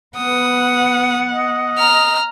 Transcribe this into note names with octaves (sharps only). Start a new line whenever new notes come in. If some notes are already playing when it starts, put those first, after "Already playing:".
B3 B4 F#5 D#6
D#5
A#5 F6